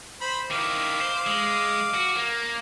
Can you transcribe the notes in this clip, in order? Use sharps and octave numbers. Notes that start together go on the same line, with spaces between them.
C5 B5
D#3 E4 F5 D6
C5
G#3
F#4
A#3